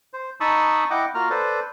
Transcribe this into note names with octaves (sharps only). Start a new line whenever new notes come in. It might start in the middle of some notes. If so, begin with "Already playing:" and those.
C5
D#4 A5 B5 C#6 D#6 E6
E4 D#5 F#5 G5 D6
A#3 F4 F#4 A#5 F6
A4 B4 C5 D5